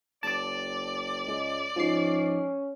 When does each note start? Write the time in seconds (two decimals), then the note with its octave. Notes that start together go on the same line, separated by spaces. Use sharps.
0.23 F#1 D5 A5 D6
1.27 C#2 G#3
1.76 G#2 F3 C#4 C7